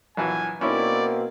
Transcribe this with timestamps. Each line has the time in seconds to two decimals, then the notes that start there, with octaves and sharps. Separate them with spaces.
0.17 A#1 E3 F#3 G#5
0.61 B2 A#3 C4 C#4 D#4 E4 D5